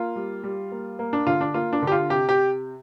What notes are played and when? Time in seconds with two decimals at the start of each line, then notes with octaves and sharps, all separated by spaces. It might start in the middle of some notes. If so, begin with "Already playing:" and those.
Already playing: A#3 F4
0.16 G3
0.44 G3
0.72 A#3
0.99 A#3
1.13 D4
1.27 D3 F4
1.41 D4
1.54 A#3 F4
1.73 D4
1.82 D3 G4
1.92 F4
2.10 C3 G4
2.29 G4